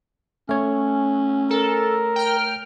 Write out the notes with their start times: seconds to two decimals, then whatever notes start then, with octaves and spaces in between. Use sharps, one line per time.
0.49 A3 C#4 C#5
1.51 A4 A#4
2.16 G5 F6